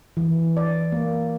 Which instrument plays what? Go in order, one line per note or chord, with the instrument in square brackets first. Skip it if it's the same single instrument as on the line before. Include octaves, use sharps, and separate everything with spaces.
[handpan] E3
D5
A#3